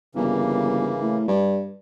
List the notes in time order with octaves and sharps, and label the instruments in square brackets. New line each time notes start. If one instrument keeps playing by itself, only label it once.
[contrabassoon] G1 [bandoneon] C#3 E3 A#3
[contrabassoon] A2
G2